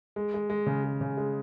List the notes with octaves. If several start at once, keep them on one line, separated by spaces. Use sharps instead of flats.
G#3
G#3
G#3
C#3
G#3
C#3
G#3